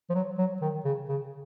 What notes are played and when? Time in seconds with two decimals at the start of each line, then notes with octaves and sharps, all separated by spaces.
0.10 F3
0.14 F#3
0.38 F#3
0.61 D#3
0.85 C#3
1.09 C#3